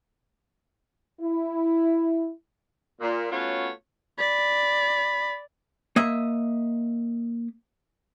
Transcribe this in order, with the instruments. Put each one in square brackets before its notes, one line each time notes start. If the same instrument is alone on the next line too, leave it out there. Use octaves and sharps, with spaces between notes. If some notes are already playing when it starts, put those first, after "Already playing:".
[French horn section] E4
[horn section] A#2
A3 B3 C#4 F4 F#4 C#5
[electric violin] D5 [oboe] B5
[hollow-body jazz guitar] A#3 D#5 E5